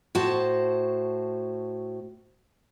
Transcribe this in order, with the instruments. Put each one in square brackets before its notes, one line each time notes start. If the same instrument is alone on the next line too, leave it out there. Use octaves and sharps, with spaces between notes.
[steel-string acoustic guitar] A2 F#4 C5 A5